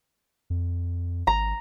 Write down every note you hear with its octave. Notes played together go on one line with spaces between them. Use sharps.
F2
G#1 A#5